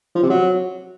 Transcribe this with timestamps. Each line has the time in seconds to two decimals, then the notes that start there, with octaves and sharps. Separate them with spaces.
0.15 F3
0.23 C3
0.30 F#3